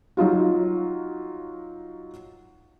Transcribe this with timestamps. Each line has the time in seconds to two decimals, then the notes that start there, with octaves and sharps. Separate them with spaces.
0.17 F#3 D#4 F4 F#4